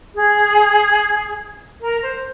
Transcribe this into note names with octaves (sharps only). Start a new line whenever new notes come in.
G#4
A#4
C5